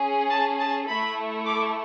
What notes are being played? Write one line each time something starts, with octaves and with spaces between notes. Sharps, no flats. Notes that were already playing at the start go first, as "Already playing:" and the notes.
Already playing: C#4 G#4
A5
A5
A3 E4 A4 B5
D6